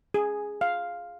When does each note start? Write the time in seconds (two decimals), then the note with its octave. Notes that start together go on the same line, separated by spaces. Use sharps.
0.14 G#4
0.61 F5